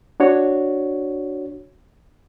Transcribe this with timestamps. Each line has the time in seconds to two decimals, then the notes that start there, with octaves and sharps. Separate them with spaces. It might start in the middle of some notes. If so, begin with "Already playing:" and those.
0.20 D4 F#4 C#5